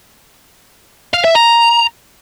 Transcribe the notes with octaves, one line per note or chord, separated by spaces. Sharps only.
F5
E5
A#5